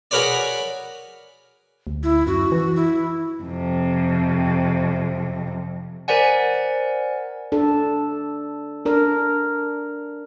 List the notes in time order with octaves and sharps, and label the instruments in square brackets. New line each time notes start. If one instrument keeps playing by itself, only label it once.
[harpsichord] F#4 G#4 A#4 B4 C#5 D5
[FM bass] D2
[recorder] E4
[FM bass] F#2 [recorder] F#4
[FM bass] E3
[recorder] E4
[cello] F2 C3
[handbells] A#4 C5 D5 F#5 G#5
[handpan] D4 A4
D4 A#4